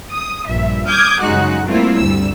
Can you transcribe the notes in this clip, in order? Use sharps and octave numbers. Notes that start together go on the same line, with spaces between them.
D#6
A#1 G2 E5
D6 D#6 F6 G6 G#6
F#2 C#3 G#3 D#4 F#4 F#6
G3 A3 A#3 C4 E4 F4
G1 D2 G3 E6